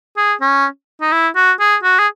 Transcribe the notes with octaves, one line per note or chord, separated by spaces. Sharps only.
G#4
C#4
D#4
E4
F#4
G#4
F#4
G#4